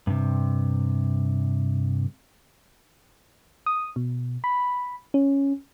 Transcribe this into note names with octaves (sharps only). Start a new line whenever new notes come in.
G2 C3
D#6
B2
B5
C#4